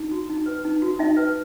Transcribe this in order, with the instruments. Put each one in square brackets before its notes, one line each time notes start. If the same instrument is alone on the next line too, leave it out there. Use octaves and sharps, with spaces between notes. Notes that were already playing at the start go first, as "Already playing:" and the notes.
Already playing: [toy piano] D#4
F#4
D#4
B4
D#4
F#4
D#4 E5
B4